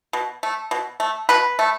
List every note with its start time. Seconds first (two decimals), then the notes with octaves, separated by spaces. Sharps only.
0.13 B2
0.43 A3
0.71 B2
1.00 A3
1.29 B2 B4
1.59 A3